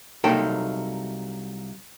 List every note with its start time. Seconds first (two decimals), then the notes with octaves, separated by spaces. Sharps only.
0.24 C2 F#3 A#3 D#4 A4 G5